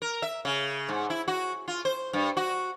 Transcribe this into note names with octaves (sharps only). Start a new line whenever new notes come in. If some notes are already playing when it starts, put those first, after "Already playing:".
A#4
E5
C#3
G#2
E4
F#4
F4
C5
G2
F#4